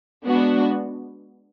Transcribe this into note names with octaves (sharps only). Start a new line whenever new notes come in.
G#3 B3 D4 F#4